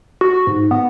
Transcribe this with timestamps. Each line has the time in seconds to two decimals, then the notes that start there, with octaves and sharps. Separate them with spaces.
0.21 F#4
0.47 G#2
0.71 B3